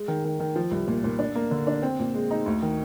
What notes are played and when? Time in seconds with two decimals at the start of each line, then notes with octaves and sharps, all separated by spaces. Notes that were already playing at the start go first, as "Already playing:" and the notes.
Already playing: G#3
0.08 D#3
0.25 D#3
0.40 D#3
0.56 F3
0.71 C2
0.88 A#2
1.04 A#2
1.19 D4
1.36 A#3
1.51 D3
1.67 D4
1.83 C4
1.99 A#2
2.14 G#3
2.31 D#4
2.46 D2
2.62 D#3